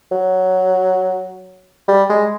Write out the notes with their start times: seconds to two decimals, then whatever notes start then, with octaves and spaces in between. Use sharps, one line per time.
0.11 F#3
1.88 G3
2.09 G#3